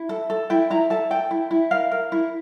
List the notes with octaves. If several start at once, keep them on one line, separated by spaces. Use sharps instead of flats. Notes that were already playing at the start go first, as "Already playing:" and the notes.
Already playing: E4
A4
A4
E4 G5
E4 A#5
A4 A5
A4 G5
E4
E4
A#4 F5
A#4
E4